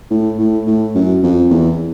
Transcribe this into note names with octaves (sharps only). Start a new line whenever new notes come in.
A2
A2
A2
F#2
F2
E2